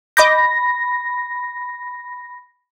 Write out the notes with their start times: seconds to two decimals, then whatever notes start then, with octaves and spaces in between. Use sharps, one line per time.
0.17 D#5 B5 D6 G6 A#6